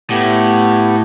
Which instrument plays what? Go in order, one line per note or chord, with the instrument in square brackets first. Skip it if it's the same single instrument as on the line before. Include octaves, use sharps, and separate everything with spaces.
[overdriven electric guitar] A2 [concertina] B3 G4